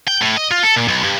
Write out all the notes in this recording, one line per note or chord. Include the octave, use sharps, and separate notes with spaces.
G5
A2
D#5
F4
A4
A#2
B1
G2